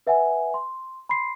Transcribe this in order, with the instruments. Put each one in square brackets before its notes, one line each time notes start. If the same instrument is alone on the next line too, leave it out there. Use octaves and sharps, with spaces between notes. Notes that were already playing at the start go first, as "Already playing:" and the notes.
[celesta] B4 E5 F#5 G#5
C6
B5 C6 C7